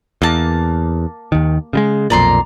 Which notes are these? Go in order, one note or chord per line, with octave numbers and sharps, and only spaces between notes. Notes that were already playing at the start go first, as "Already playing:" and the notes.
E2 A#3 A5
D#2 D#3
C#3 G3 G#3
B1 F2 A#2 D5 A#5 C6